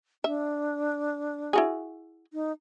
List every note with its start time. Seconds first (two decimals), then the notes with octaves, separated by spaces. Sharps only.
0.24 D4 E5
1.53 E4 F#4 G#4
2.33 D#4